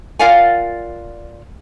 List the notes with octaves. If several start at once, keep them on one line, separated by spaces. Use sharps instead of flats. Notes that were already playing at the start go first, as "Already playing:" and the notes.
F4 A#4 D5 F5 F#5 G#5